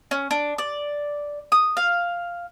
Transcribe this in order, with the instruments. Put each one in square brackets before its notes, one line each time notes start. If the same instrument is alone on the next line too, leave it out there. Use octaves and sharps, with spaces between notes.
[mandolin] C#4
D4
D5
D#6
F5